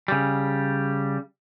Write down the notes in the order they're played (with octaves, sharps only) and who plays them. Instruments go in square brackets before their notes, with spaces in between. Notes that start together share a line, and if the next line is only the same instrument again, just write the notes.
[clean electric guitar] C#3 G3